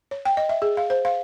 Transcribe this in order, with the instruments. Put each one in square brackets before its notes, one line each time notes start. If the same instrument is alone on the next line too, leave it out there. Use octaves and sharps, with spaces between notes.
[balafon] C#5
G5
D#5
E5
G#4
F5
C5
F5